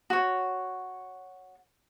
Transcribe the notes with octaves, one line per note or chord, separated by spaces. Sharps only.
F#4 C#5